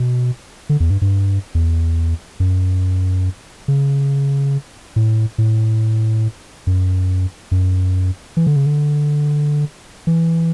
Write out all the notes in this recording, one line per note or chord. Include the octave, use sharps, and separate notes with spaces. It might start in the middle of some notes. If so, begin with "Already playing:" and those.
Already playing: B2
D3
E2
G2
G2
E2
F#2
C#3
A2
A2
F#2
F#2
E3
D3
C#3
D3
E3